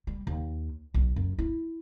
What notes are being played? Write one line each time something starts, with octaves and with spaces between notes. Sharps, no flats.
G3
D#2
B1
F#2
E4